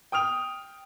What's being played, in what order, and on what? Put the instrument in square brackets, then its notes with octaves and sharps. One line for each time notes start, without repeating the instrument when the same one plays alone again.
[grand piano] G5 D#6 F6 F7